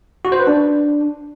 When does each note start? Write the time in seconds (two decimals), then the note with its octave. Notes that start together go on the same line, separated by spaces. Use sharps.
0.25 F#4
0.32 C5
0.40 B4
0.47 D4